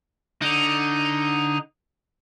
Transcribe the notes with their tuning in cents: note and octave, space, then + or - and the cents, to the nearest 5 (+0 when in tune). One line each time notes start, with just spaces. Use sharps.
D3 +0 D#4 +0